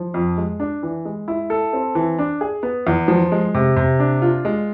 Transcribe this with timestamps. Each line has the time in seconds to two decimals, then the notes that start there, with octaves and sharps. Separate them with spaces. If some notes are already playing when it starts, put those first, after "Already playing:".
Already playing: F3
0.14 F2
0.38 G#3
0.60 D4
0.83 E3
1.05 G#3
1.28 E4
1.50 A4
1.73 C4
1.95 E3
2.19 D4
2.41 G#4
2.63 B3
2.87 E2
3.08 F3
3.32 G#3
3.54 C3
3.76 C3
4.00 D4
4.22 F4
4.45 G#3